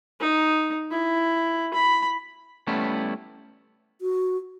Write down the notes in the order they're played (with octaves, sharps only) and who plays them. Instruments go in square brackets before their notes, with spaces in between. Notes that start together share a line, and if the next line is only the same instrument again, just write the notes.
[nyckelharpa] D#4
E4
B5
[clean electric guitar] G3 A3 B3 C#4 E4
[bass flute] F#4